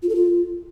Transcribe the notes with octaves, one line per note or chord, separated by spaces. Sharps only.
F4
A4
F4